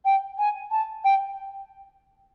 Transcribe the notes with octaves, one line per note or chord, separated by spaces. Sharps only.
G5
G#5
A5
G5